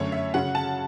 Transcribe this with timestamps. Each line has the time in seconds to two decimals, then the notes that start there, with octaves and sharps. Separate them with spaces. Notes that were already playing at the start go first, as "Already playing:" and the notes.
Already playing: F#2 D3 A3 C#4 C#5
0.12 E5
0.34 C#3 F#3 C#4 F#5
0.55 A5